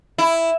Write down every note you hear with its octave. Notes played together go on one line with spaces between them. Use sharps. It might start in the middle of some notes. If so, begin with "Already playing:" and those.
E4